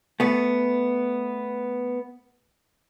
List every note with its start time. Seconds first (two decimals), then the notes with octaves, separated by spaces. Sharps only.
0.20 A3 B3